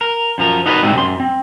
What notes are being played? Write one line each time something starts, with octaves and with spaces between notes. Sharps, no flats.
A#4
F#2 F3 A#4
D#4 F#4 A#4 B4 C#5 D#5
G#2 C3 G#3 C4
F#2 C6
C4